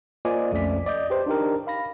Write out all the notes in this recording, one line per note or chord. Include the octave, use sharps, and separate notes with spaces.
A#3 F4 C5 D5 D#5 G#5
B1 F2 A3 C#4 D5 B6
D5 D#5 G6
G4 B4 C5
D4 D#4 G4 A#4
F5 B5 A#6